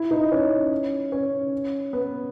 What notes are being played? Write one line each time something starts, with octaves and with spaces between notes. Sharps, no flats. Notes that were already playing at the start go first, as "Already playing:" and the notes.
Already playing: E4
D#4
C#4
C#4
B3